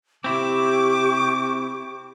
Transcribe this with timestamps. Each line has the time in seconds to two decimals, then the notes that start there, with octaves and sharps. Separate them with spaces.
0.24 C3 C4 E4 G4 C#6 D6